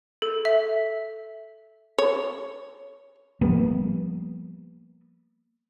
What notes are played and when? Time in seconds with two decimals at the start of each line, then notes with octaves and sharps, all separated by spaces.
0.22 A4
0.45 E5
1.98 C#5
3.41 F3 G3 A#3 B3